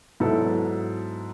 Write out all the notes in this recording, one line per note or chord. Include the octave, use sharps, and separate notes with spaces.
G#2 F#3 B3 E4 A4